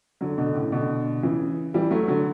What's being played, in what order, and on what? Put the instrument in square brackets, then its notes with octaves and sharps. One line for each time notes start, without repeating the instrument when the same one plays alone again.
[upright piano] D3 F#3
B2 D3
A2 C#3
B2 D3
C#3 E3
E3 G3
F#3 A3
D3 F#3